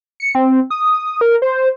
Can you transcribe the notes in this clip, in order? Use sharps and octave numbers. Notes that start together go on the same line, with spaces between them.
C#7
C4
D#6
A#4
C5